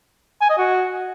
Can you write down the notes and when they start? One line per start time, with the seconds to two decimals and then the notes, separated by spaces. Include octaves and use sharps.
0.41 G#5
0.50 D#5
0.58 F#4